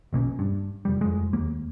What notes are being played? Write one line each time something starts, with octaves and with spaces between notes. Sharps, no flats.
A#1 B2 A#3 C#4
G2
F1 G3
F2 G#3
D#2 A#3